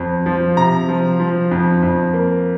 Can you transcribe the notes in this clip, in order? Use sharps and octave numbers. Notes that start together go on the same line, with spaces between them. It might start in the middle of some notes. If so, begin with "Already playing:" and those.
Already playing: F2
F3
C3 A#5
F3
F3
F2
F2
A#3